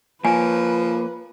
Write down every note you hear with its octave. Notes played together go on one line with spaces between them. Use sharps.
F3 A#3 B4 C#5 G#5